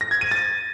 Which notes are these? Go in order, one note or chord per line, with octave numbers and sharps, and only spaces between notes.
A#6
G#6
D#7
A6